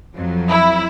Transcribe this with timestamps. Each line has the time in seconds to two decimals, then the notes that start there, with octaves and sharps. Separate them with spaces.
0.15 F2 F#3
0.48 E4